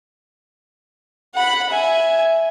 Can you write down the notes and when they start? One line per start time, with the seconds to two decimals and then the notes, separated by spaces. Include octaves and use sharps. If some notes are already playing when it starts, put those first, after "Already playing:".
1.34 F#5 B5
1.69 E5 G#5